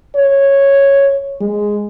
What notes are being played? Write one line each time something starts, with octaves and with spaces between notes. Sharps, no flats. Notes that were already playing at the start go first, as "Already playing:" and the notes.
C#5
G#3